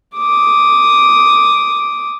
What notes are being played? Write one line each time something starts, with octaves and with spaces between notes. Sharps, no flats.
D6 D#6